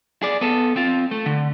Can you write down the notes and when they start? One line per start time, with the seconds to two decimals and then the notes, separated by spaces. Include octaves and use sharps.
0.23 G#4 D5
0.41 B3 A4
0.76 C4 F4
1.11 A3
1.26 D3